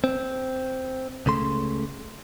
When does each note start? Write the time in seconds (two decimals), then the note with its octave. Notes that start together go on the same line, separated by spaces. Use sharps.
0.04 C4
1.26 C#2 C#3 A3 C6